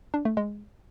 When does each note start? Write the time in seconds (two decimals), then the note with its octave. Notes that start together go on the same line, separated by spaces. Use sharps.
0.14 D4
0.25 A3
0.37 G#3